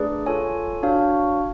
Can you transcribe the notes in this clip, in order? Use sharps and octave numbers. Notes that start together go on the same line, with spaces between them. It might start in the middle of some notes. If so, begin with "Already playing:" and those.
Already playing: A3 D4 G#4 B4 D5
F4 A4 C#5 G#5
D4 F#4 C#5 F5